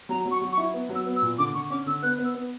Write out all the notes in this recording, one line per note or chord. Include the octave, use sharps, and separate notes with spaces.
F#3 A#5
F#3
C#6
F#3
C#6
E4
B3
F#3
E6
B3
E6
A#2
D3 D6
D3 C#6
C#4 D6
D3 E6
B3 F#6
B3
E6
B3